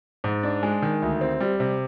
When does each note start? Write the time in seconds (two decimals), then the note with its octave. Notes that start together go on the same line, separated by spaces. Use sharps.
0.24 G#2
0.43 D4
0.63 G#3
0.82 D#3
1.02 D2
1.21 C4
1.40 G3
1.60 C3